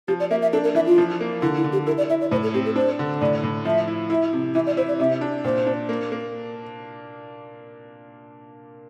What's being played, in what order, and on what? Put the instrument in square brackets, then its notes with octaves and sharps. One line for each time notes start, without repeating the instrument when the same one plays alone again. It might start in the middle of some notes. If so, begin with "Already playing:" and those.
[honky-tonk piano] F3 [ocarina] G4
[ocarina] D5
[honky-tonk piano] A#3 [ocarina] E5
[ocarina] E5
[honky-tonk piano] D4 [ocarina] A4
[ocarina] A#4
[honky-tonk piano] E3 [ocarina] E5
[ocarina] F4
[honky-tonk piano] F3
A#3
[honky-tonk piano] D3 [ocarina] E4
[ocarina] E4
[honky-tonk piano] D3
[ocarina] G4
[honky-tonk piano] E4 [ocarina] A#4
[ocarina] D5
[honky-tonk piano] E4 [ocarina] E5
[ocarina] D5
[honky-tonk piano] A2 [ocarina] C5
[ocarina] A4
[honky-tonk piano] C4 [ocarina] G4
[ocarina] A4
[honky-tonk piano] D4 [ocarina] C5
[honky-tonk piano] D3
[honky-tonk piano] A2 [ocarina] D5
[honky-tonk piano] A2
[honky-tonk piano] F3 [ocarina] E5
[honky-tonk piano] E4
[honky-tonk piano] E4 [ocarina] E5
[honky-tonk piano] C3
[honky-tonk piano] E3 [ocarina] E5
[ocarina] D5
[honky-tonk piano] E4 [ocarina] C5
[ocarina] D5
[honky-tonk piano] C3 [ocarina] E5
[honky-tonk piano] D4
[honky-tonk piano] A#2 [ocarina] C5
[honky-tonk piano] D4
A#3
A#3